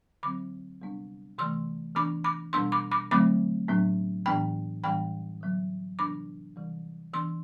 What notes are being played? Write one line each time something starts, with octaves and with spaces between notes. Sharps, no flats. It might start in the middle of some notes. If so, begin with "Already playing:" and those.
D3 F#3 C4 B5 D6
C3 G3 B3 D4
C3 E3 A3 C6 E6
E3 B3 D4 B5 D6
B5 D6
B2 G3 B3 D4 C6 E6
B5 D6
B5 D6
D3 F#3 A3 C4 B5 D6
A2 F#3 B3 D4
A2 E3 B3 D4 G5 B5
A2 E3 G3 B3 D4 G5 B5
D3 F#3 B3
C3 E3 B3 D4 B5 D6
C3 E3 G3
E3 B3 D4 C6 E6